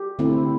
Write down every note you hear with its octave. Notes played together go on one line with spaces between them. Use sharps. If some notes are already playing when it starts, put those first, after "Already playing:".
Already playing: G4
D3 A3 C4 E4